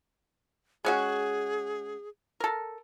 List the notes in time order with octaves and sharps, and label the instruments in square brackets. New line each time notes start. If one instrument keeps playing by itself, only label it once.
[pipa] G#3 C#4 F#4 [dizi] G#4
[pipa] A4 A#4